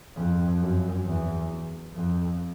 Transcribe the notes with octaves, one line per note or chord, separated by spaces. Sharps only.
F2
F#2
E2
F2